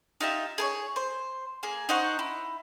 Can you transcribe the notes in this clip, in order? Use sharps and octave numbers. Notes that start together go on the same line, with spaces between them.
D#4 F4 G4 E5
G#4 A#4 C#5
C5
A#3 G#4
D#4 C5 F#5 C#6
E4